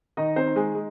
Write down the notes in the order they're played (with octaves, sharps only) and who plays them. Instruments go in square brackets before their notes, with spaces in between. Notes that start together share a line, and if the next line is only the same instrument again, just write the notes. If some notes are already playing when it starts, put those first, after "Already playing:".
[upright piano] D#3 D#4 D#5
C4 C5
D#4
G#3 G#4
G#3